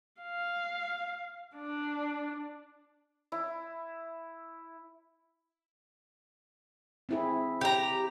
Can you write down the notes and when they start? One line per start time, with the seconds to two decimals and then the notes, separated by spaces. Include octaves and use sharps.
0.22 F5
1.57 D4
3.32 E4
7.09 C4 E4 G#4
7.61 G4 A#5